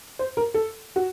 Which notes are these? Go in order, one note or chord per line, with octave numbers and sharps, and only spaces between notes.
C5
A#4
A4
F#4